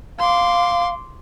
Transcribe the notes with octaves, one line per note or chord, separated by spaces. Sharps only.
F5 C6 D6